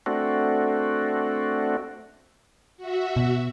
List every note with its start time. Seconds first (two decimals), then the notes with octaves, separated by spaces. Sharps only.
0.06 A3 C4 D4 F#4
2.77 F#4 E5
3.16 B2